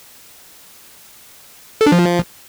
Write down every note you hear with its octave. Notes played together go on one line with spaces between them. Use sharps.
A4
D4
F3